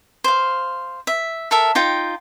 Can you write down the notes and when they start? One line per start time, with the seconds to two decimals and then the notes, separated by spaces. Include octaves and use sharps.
0.24 C5 F5
1.07 E5
1.51 A4 A#4 E5
1.75 D#4 F4 G5